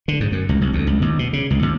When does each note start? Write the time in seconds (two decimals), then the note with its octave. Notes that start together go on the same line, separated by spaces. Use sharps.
0.08 D3
0.21 G#2
0.32 F#2
0.49 C#2
0.61 C2
0.73 D2
0.87 C#2
1.02 D#2
1.19 B2
1.33 C#3
1.50 C#2
1.62 D#2